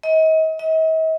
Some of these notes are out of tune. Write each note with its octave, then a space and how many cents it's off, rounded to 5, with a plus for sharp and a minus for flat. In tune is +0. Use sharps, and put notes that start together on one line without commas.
D#5 +35
D#5 +45